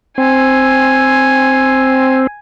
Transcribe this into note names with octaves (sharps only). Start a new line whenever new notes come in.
C4 G#5